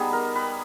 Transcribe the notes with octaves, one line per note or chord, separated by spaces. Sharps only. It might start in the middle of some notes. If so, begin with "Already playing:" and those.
Already playing: G3 B3 D#4 G#4
A#4
B4